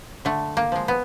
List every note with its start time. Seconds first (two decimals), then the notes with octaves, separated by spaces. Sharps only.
0.25 D3 A3
0.57 A#3
0.72 F3 G#3
0.88 B3